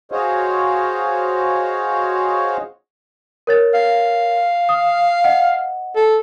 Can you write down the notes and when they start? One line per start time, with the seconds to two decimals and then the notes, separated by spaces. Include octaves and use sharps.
0.12 F#4 G#4 C5 C#5 D#5 F5
3.47 A#4 C#5 A6
3.74 F5
4.69 D#6
5.24 D#5 F#5
5.96 A4